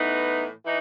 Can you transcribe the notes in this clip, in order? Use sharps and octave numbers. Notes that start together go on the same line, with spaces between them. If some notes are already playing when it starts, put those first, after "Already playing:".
Already playing: A2 E3 B3 D#4
E3 D#4